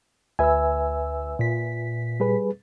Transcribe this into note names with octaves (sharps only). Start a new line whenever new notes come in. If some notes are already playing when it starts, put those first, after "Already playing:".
D2 B4 E5 G#5 E6
A#2 B6
G3 G#4 B4